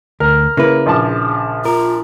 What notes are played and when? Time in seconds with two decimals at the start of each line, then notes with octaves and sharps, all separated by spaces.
0.20 D2 A#4
0.57 C#3 A#3 E4 B4
0.86 A#1 F3 A5
1.65 F4 A#4